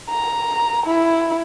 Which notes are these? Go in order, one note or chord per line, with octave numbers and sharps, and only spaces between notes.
A#5
E4